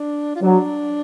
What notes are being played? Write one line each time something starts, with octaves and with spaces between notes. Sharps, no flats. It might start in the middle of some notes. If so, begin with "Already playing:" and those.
Already playing: D4
F4
F#3 D4